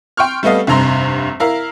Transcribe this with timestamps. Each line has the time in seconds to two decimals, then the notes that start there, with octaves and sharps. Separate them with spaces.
0.17 G5 C6 C#6 F6
0.43 G3 A3 B3 A4 D#5 F5
0.67 F1 G2 C3 A#5 C6
1.40 E4 A#4 F5